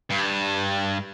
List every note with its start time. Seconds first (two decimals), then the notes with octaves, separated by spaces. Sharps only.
0.10 G2